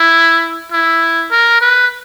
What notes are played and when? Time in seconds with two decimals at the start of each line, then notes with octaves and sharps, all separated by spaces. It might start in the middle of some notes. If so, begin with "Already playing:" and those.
Already playing: E4
0.72 E4
1.31 A#4
1.61 B4